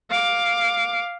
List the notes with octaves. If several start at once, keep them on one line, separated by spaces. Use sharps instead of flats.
F5 D6